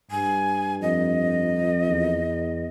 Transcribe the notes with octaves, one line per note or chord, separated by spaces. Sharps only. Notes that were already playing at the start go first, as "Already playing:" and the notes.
G2 G#5
F2 D#5
E2